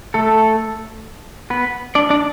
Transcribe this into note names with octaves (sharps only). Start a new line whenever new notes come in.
A3 A4
B3 B4
D4 D5
D4 D5